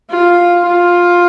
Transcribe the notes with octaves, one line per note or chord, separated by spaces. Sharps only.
F4
F4